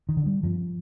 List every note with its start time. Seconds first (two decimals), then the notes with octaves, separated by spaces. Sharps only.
0.09 D#3
0.17 D3
0.26 G3
0.43 G2 F3